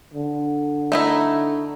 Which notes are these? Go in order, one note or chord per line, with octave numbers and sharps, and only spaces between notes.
D3
A3 D#4 E4